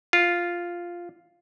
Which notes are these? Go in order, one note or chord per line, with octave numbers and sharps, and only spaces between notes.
F4